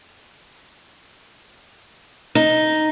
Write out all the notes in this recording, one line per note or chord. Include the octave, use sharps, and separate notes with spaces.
D#4